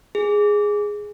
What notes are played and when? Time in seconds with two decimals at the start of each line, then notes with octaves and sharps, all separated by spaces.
0.15 G#4